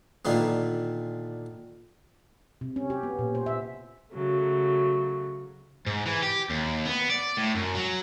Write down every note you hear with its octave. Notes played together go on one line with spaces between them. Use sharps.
A#2 D3 D#3 A#3 B3
C3
C#4
G4
B3
A#2
C5
E5
C#3 F#3 A3
G#2
E3
G4
D#2
B3
D5
A2
F#2
F#3